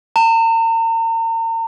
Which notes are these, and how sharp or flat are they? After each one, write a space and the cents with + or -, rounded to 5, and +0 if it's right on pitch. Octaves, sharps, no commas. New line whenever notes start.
A#5 -40